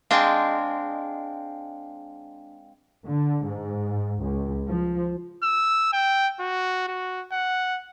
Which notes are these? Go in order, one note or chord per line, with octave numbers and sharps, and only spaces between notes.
G#3 C4 D4 F5 G5
D3
G#2
C#2
F3
E6
G5
F#4
F#4
F#5